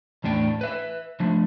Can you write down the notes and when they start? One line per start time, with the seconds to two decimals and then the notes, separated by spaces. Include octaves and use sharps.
0.24 E2 A2 D4 G5
0.61 B4 E5
1.20 F3 A3 D4